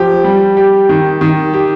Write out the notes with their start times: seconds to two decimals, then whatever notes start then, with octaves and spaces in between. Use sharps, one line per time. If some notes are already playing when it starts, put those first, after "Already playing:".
Already playing: F3 G4
0.24 G3
0.57 G4
0.89 D#3
1.21 D#3
1.54 G4